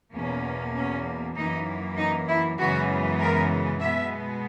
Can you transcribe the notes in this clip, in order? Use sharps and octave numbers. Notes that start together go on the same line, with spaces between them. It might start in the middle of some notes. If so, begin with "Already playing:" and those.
E2 B2 A#3 C#4
C#4
F#2 E3 A#3 D#4
D#4
E4
F#2 C#3 E3 G#3 B3 F#4
A#4
B2 G#3 B3 E5